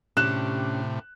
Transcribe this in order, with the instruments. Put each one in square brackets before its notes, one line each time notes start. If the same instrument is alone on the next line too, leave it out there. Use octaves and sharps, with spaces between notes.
[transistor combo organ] A2 C3 [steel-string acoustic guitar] C#4 D4 G4 [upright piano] F#6 E7